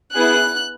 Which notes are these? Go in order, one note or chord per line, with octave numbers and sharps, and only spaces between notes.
B3 E4 G#4 F#6